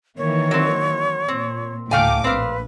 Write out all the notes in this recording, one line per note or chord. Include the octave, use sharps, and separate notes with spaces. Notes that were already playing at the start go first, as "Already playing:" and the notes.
D#3 E3 A#3 C#5
F#3 C4
A#2 C4
D2 A2 A3 F5 G5 G#5 D6
A#1 C4 B4 F5